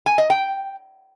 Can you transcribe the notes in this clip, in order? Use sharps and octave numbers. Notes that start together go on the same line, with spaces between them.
G#5
D#5
G5